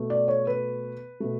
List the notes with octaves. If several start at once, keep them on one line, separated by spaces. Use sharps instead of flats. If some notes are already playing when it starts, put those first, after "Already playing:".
Already playing: B2 A3
D5
C#5
B4
B2 A3